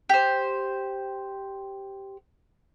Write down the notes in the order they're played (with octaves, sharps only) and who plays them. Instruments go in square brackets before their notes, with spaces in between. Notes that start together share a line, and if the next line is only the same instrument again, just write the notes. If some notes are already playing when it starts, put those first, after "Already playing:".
[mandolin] G4 C5